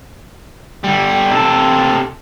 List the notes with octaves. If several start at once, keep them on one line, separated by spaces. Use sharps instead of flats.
D3 G3
C3 A4